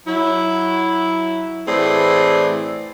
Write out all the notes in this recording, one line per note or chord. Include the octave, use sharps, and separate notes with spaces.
F#3 E4
A2 E3 C4 G#4 D5